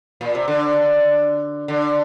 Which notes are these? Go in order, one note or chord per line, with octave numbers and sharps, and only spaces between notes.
A#2
C3
D3
D3